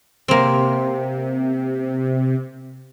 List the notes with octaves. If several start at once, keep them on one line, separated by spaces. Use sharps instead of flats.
C3 A#3 C4